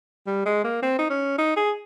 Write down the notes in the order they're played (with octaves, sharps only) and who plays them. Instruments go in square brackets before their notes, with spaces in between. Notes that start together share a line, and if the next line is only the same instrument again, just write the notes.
[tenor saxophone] G3
G#3
A#3
C4
D#4
C#4
D#4
G#4